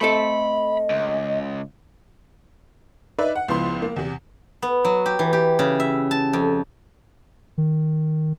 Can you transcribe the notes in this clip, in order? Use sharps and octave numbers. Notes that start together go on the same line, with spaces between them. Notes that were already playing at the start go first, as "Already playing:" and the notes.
A3 C4 A4 D#5 B5
C#2
D#4 B4 D5 E5
F#5
C#2 F3 B3 E4 C6
A#3
E2 C3
B3
F#3
G4
E3
G4
C#3
E5
A5
F2
D#3